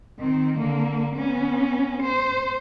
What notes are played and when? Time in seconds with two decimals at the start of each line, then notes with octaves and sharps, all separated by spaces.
0.19 D#3 C4
0.57 D3 A#3
1.15 B3 C#4
2.03 C5